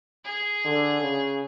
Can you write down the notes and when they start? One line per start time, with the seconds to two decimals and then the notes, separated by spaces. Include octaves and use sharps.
0.25 G#4
0.65 D3
1.02 C#3